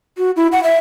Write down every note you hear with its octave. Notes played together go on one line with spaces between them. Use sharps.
F#4
E4
F#5
E5